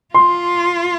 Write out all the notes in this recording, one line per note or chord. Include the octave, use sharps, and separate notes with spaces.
F4 C6